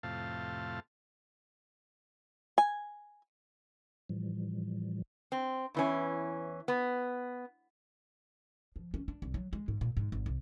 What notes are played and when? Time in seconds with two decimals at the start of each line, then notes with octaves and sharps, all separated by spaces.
0.03 F2 A2 C3 F5 A5
2.58 G#5
4.09 A2 E3 F3 G3
5.32 C4
5.74 E2 E3 C#4
6.68 B3
8.76 F3
8.94 C#4
9.08 D4
9.22 C2
9.34 F#3
9.53 G#3
9.68 G#2
9.81 A#2
9.97 G#2
10.12 G#1
10.26 C2